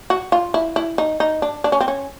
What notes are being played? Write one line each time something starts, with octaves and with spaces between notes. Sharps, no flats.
F#4
F4
E4
E4
D#4
D#4
D4
D4
C#4
C4
C#4